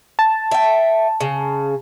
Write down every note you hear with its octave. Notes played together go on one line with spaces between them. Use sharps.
A5
E5 G5
C#3